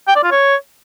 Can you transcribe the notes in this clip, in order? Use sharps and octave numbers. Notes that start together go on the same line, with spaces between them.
G5
D5
F4
C#5